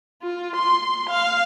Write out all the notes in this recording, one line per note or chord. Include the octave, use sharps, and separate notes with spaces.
F4
C6
F5